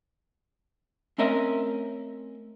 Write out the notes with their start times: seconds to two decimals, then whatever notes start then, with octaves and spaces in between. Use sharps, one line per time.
1.18 A3 C4 C#4 A#4 D#5 E5